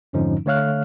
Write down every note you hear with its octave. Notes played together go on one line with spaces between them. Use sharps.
F2 G#2 D3 F3 C#4 D#4
D3 A3 C#5 F5 F6 F#6